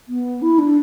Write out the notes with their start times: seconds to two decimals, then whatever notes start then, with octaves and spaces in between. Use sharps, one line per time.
0.08 B3
0.42 E4
0.59 D4